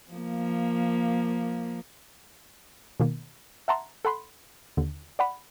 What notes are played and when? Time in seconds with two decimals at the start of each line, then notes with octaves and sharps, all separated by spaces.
0.11 F3 A#3
3.00 B2 D#3 A#3
3.68 E5 F#5 A5 A#5 C6
4.05 A4 F#5 B5 C6
4.77 D#2 D3
5.19 D5 F#5 B5